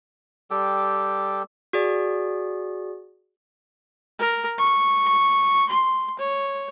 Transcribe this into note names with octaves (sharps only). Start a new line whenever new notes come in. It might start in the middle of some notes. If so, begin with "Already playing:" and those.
G3 G4 A4 G5
F#4 G#4 D5
A#4
C#6
C6
C#5